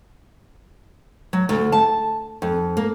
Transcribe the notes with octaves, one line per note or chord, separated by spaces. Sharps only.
F#3
D2
A5
F2
A#3